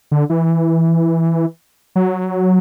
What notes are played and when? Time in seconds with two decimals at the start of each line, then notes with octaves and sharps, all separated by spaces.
0.11 D3
0.30 E3
1.96 F#3